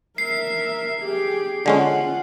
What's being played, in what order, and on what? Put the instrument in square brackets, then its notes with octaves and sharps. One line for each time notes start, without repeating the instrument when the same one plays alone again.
[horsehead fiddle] A#4 E5 [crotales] C7
[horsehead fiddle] G4 G#4
[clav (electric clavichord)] D3 G#3 C#4 [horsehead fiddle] F4 F#5